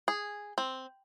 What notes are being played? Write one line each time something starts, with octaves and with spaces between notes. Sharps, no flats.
G#4
C4